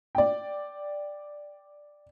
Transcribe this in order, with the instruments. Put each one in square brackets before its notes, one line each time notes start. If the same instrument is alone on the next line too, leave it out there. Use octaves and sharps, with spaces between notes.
[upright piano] D5 G5